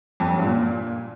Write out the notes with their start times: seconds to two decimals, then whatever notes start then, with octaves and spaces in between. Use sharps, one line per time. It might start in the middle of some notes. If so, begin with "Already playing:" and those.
0.20 F2
0.26 G2
0.32 F#2
0.39 G2
0.45 A#2